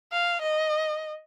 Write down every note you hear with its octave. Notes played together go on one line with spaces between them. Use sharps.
F5
D#5